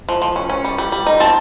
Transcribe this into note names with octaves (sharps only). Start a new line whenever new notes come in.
F3
F3
C#4
C#4
G3
G3
G3
D#4
C4 A5